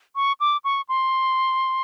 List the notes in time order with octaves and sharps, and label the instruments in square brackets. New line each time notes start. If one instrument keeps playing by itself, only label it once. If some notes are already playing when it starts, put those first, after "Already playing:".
[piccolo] C#6
D6
C#6
C6